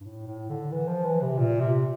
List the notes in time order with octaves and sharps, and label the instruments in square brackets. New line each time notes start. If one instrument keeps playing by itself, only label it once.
[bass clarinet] G2
A2
A2
D3
E3
F3
E3
C3
A#2
C3